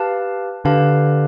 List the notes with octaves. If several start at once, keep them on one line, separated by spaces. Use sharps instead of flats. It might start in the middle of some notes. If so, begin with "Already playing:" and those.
Already playing: G4 B4 F5 A5
D3 G4 B4 F5 A5